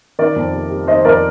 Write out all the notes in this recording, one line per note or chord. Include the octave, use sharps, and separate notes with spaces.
D#3 A#4 D5
F2
C3
G3
D#3 C5 D#5
F2 A#4 D5